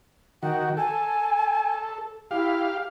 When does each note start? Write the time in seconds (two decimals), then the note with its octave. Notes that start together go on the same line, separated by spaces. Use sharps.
0.43 D#3 F#4 G5
0.77 A4 G#5
2.31 E4 G4 F5